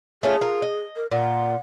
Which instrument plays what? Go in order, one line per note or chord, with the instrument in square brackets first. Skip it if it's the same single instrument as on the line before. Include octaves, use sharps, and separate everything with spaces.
[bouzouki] A3 C#4 F4 [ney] G#4
[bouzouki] F4 A#4
D#5
[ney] A#4
[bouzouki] A#2 F4 [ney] F#5